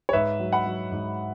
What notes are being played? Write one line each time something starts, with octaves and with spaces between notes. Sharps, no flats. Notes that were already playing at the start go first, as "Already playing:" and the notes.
C#5
G#2 B4 E5
F#3
F#5 B5
F#3
G#2